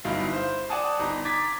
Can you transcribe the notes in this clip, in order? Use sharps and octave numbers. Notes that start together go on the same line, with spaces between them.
G1 G2 F#3 D#4 E4 F5
C5
D5 F#5 G#5 A5 D#6
G1 D#4 A#5
A#5 D6 G#6 A6 B6